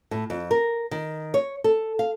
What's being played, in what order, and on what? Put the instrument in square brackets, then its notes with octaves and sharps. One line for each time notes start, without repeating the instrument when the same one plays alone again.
[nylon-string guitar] A2
F2
A#4
D#3
C#5
A4
F5